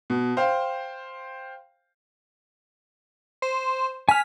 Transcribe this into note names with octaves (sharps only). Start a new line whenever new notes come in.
B2
C5 F5 G5
C5
G#5 F6 B6